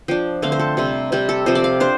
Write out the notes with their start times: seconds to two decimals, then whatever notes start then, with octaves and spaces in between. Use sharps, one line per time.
0.08 F3 D4 G5
0.42 D3 A3 C4 F5
0.52 C5
0.59 A4
0.77 C3 G3 C4
1.12 C3 G3 C4 G4
1.29 A4
1.46 C3 F3 C4 C5
1.55 D5
1.64 F5
1.80 D4 C5